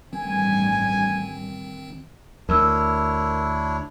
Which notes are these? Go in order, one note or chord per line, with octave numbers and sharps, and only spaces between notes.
A1 G2 D#3 C4 G#5
D2 D4 E4 A#4 C#5 E6